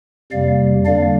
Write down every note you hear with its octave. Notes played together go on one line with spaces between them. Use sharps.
F2 C3 G3 A#3 D5 F5
F2 D3 G3 A#3 D4 D5 F5